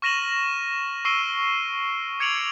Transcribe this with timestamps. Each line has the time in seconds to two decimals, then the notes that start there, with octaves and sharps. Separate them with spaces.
0.02 C#6 F6 A#6 D#7 E7 F#7
1.05 C#6 E6 C7 D7 D#7 G7
2.20 D6 G#6 C#7 D7 F7 F#7